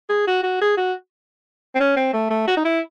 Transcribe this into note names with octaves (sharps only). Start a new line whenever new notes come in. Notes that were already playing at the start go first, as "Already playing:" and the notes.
G#4
F#4
F#4
G#4
F#4
C4
C#4
C4
A3
A3
F#4
D#4
E4